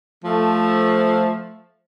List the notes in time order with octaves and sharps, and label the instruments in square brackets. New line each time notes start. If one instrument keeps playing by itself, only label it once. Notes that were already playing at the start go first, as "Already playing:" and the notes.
[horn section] F3 A3